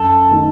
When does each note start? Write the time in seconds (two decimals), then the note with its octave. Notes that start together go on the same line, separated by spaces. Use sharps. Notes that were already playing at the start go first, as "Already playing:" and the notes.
Already playing: F#2 A4
0.31 D#3 A3 D#4